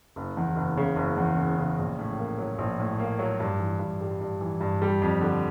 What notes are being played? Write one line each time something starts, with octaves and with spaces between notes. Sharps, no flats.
F#1
E2
F#1
C#3
F#1
E2
F#1
C#3
A#1
A2
A#3
F#3
A#1
A2
A#3
F#3
G2
E3
G2
G3
G2
E3
G2
G3
F2
D3